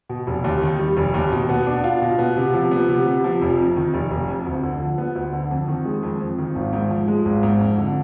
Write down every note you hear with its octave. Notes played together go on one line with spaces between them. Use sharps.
B2
F1
D#2
D#3
G3
F1
D#2
B2
B3
D4
F4
B2
B3
C3
F3
B3
C3
C3
F3
F1
F2
D#3
F1
F1
F2
D2
D3
F3
B3
D2
D3
F2
D#3
G#3
F2
F2
D#3
G#1
G#2
F3
G#3
G#1
G#2
F2
D3